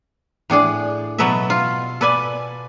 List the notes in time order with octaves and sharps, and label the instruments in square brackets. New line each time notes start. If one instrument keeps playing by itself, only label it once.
[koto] A2 D4 G#4 D5
B2 F#3 A4 B4 D#5 E5
F4
A4 B4 D5 G#5